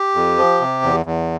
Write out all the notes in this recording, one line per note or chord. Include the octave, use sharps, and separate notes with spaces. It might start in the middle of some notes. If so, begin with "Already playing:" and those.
Already playing: G4
F2
F3
C3
E2
E2